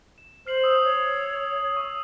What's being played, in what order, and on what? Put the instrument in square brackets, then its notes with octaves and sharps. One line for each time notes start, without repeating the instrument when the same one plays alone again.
[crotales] E7
[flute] C5 [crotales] F6 C7 F#7
[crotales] D#6 E6
[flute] C#5
[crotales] C#6 D#6